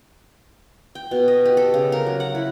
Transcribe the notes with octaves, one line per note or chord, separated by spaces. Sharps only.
G5
B2
D#5
G4
A4
C#3
A#4
F#3
F#5
E4